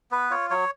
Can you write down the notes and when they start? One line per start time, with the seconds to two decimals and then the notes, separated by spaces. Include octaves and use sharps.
0.11 B3 B4
0.30 F4 C#5
0.50 F#3 C#5